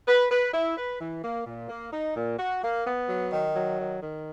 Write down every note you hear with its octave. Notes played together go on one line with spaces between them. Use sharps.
B4
B4
E4
B4
E3
A#3
A#2
A#3
D#4
A#2
F#4
A#3
B3
F#3
D#3
F#3
D#3
D#3